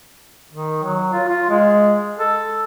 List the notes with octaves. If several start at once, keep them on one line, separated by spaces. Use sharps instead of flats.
D#3
F#3
F4
F4
G#3
A4